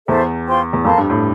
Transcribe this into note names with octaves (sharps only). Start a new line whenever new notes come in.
E2 E4 A4 C5 E5
F4 C5 G5 C6
E2
F2 A#4 F5 A5 C6
G2
A2